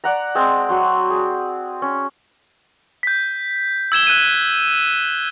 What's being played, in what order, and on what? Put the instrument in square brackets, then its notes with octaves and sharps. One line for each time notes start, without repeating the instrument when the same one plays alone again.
[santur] D5 F#5 A#5
G#3 C4 A5
F#3 C6
G#4
C#4
[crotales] G6 B6
E6 G#6 E7 G7
F#6 D#7